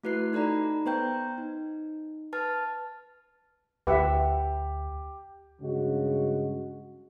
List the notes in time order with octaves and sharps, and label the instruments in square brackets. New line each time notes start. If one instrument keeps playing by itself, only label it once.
[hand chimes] A3 E4 F#4 B4 F#6 C7
D#4 A4 D5 A#5 B5
B3 B4 C5 G5 A#5 G6
D#4
B4 A5 F6 A6
[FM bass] D2 [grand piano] G4 [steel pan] B4 E5 F#5
[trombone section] G2 C#3 G#3 F#4